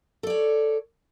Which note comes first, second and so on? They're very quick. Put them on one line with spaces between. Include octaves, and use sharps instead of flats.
A4 D5 C#5